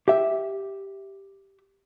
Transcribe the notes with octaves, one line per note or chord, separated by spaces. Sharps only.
G4 E5